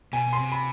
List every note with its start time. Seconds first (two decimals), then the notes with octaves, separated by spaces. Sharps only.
0.13 B2 G#5
0.27 B2
0.33 C6
0.39 C3
0.52 B5